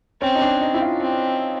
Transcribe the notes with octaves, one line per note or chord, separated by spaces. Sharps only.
C4 C#4
D#4
D4
D#4
E4
F4
C4